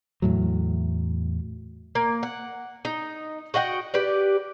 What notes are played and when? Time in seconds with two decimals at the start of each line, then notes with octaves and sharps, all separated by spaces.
0.22 E2 A2 F#3
1.95 A#3
2.23 F#5
2.85 D#4
3.54 F#4 D#5 F#5 G5
3.94 G4 B4 D5